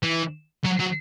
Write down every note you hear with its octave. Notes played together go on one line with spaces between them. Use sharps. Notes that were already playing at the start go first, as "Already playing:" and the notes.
E3
F#3
F#3